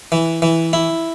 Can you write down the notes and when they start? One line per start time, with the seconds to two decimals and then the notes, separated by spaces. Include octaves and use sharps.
0.12 E3
0.42 E3
0.73 E4